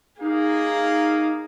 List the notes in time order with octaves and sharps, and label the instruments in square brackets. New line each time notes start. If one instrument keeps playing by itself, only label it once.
[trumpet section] A#3 F5 D#6 [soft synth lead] D#4 [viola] G#4